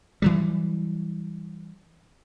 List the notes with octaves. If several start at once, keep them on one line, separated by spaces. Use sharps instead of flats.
E3 F#3 G3